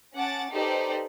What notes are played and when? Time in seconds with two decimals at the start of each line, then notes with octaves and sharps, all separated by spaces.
0.15 C#4 F#5 A5 D6 A6
0.52 D#4 G4 A4 B4 C5 D5